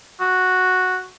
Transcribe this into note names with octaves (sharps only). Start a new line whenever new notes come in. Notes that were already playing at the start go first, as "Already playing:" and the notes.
F#4